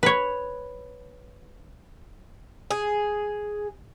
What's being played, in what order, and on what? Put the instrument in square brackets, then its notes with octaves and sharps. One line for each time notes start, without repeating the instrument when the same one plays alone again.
[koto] B4 C#5
[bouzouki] G#4